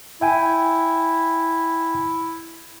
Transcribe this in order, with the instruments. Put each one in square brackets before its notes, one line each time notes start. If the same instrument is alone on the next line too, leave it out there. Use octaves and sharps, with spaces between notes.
[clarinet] E4 [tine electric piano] E5 G5 G#5